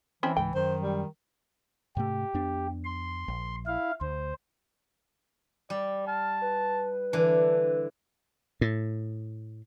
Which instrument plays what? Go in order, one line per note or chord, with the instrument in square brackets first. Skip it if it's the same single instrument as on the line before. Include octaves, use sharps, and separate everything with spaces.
[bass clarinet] E3 [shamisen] C4 C#4 E4
[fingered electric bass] C#2 G#2 [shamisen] G5
[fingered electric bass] F#2 [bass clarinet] D#3 [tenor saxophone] C5
[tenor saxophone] G3
[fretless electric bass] G#2 C3 A3 [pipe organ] G4
[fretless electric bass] F2 B3 D4
[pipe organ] C6
[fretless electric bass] A#1
[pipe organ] E4 F5
[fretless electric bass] D2 [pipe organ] C5
[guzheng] G3 [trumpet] D5
[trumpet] A5 [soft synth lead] F6
[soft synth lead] B4
[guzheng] D3 E3 [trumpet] D4
[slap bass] A2